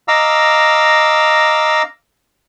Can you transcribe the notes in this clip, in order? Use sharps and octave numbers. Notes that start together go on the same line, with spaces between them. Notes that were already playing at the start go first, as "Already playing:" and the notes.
D#5 F5 A#5 D6 E6